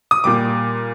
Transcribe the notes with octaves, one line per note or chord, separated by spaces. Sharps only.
D#6
A#2 G3 D6